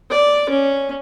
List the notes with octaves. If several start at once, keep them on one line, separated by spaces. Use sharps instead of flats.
D5
C#4